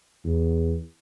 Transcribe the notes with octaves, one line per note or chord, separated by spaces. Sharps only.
E2